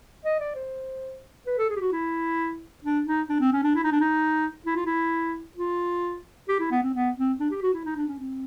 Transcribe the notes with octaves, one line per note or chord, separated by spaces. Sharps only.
D#5
D5
C5
B4
A4
G#4
G4
F#4
E4
D4
D#4
D4
C4
C#4
D4
E4
D#4
D4
D#4
E4
F4
E4
F4
G4
E4
B3
C4
B3
C4
D4
G4
F#4
E4
D#4
D4
C#4
C4